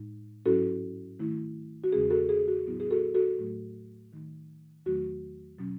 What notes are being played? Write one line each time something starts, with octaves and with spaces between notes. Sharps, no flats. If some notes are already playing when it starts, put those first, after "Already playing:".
Already playing: A2 G#3 D#4
G#2 F#3 C#4 E4 F#4 A4
D#3 A3 E4
F#4
E2 C#3 G#3 C#4 G#4
F#4 A4
G#4
F#4
A2 F#3 B3 E4
G#4
F#4 A4
F#4 A4
A2 F#3 A3
D#3 A3 D#4
E2 D#3 F#3 A3 F#4
B2 F#3 C#4